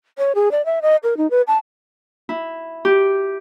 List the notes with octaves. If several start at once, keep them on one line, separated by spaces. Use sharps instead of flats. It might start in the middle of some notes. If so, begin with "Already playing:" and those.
C#5
G#4
D5
E5
D#5
A#4
D#4
B4
A5
E4
G4